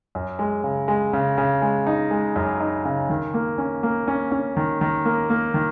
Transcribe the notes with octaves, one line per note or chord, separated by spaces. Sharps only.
F#2
G#3
C#3
G#3
C#3
C#3
G#3
D#4
G#3
F#2
D#4
C#3
D#3
A#3
C#4
A#3
C#4
C#4
D#3
D#3
A#3
A#3
D#3